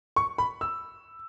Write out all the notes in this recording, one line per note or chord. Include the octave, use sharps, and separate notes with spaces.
C#6
B5
E6